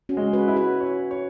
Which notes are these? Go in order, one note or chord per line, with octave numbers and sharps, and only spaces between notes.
C#4 F#4
G#3
F#4 B4
E4
F#4 B4
C#5
C#5